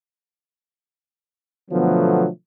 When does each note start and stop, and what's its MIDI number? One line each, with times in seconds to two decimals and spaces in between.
1.71 2.27 47
1.71 2.27 50
1.71 2.27 53
1.71 2.27 54
1.71 2.27 57
1.71 2.27 59